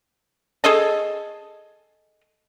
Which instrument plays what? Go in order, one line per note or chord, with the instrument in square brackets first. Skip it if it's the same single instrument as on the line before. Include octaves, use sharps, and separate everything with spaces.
[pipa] G#4 A4 D#5 A5